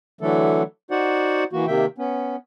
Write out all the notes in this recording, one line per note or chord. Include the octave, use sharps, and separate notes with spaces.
D3 E3 F#3 A3 A4
D#4 F#4 C5 D5 F#5
E3 A#3 F#4
C3 D#3 A#3 E5 G5
B3 C#4